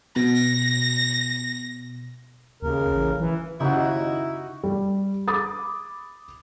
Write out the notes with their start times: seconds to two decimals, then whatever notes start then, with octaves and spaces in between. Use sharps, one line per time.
0.16 B2 A#6
2.62 D#2 C#3 A#4
2.91 A1
3.20 E3
3.60 D#2 C#3 D#4 E4 F#4
4.64 G3
5.28 B5 D6 D#6 A6